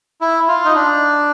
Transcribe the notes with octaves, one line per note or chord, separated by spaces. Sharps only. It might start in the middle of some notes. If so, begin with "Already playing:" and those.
E4
F4
D#4
D4